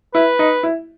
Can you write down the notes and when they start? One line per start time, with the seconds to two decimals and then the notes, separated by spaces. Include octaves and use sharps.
0.14 E4 B4
0.39 D#4
0.63 E4